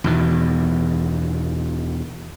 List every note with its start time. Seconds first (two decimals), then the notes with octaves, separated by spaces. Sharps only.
0.04 E2 B2 D#3